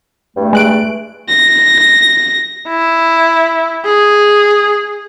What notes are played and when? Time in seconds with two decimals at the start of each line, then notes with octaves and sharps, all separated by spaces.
0.36 E2 G2 A3
0.53 G#3 F#6 D7
1.29 A#6
2.68 E4
3.85 G#4